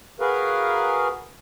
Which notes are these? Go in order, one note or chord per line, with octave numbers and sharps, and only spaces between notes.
F#4 G#4 A#4 B4 F5